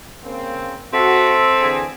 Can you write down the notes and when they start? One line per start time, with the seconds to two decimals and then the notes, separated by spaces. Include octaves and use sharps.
0.23 C#3 A#3 C4
0.93 C4 F#4 A4 E5
1.60 D3 E3 G#4